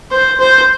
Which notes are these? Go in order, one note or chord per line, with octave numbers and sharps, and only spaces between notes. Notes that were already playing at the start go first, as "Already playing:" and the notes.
C5
C5